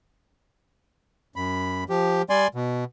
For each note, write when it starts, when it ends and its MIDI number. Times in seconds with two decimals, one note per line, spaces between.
1.36 1.84 42
1.36 1.84 83
1.89 2.22 53
1.89 2.22 67
2.30 2.48 55
2.30 2.48 74
2.30 2.48 80
2.30 2.48 84
2.55 2.84 47